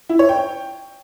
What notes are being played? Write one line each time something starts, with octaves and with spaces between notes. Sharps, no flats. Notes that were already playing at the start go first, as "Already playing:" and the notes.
E4
C#5
G5